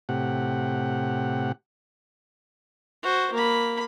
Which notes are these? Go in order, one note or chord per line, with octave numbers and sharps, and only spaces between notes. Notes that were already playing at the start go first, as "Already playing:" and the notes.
A2 C3 G4 F#5
F#4 C5
A#3 B5